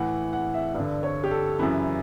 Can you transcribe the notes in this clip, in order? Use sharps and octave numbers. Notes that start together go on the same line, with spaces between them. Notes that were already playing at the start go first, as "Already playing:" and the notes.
Already playing: A2 E3 F#5
F#5
E5
G2 D3
C#5
G4
A4
F#2 C#3 E3 E4